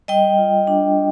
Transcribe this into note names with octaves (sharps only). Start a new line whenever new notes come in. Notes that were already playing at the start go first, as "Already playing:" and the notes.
G3 D#5 G5
F4
D4